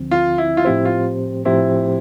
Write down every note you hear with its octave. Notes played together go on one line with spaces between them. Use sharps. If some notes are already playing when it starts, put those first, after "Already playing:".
Already playing: D2 D3 F3 C4
F4
E4
F4
A2 F3 C4 E4 G4 C5
F4
A2 F3 C4 E4 G4 C5